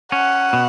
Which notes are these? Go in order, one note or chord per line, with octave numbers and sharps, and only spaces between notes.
C#4 F#5
B2